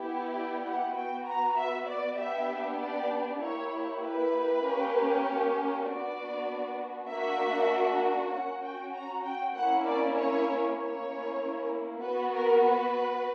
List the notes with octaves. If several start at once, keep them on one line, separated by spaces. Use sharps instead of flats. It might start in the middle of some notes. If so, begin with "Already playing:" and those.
Already playing: B3 E4 G4
D5
F#5
B3 F#4 G5
A#5
E5
D5
B3 D4 G4 E5
D5
A#3 E4 G4 C#5
B4
A#3 C#4 G4
B3 D4 F#4 D5
A#3 D4 F#4 E5
C#4 F#4 F#5
G5
A#5
G5
A#3 C#4 E4 F#5
D5
C#5
A#3 C#4 E4 C#5
B3 F#4 B4
A#4
B4